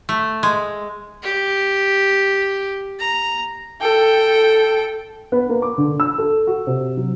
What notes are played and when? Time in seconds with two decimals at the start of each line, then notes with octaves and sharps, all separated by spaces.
0.09 A3
0.43 G#3
1.23 G4
2.99 A#5
3.81 A4 G5
5.32 B3
5.49 A#3
5.62 D6
5.78 D3
6.00 E6
6.18 A4
6.47 F#4
6.67 C3
6.97 F#3